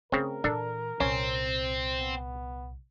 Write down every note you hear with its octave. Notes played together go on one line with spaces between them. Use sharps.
C#3 A3 C4 A#4
A#2 E3 D4 A4
C2 A#2 C4 C#4
B3